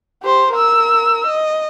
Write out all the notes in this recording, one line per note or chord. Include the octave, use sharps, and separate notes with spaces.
G4 C5
A#4 E6
D#5